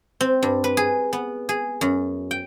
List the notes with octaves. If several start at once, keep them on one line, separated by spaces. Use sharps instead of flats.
C4
G2
B4
G#4
B3
G#4
F#2
G5